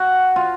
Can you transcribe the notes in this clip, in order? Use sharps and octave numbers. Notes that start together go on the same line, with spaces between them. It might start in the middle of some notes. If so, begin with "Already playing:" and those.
Already playing: F#4
F4